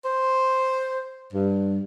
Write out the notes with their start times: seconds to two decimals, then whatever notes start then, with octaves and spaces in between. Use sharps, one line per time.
0.04 C5
1.33 G2